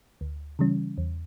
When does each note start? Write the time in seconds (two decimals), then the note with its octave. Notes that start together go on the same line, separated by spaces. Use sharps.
0.21 D2
0.59 C#3 E3 G3 C#4
0.98 E2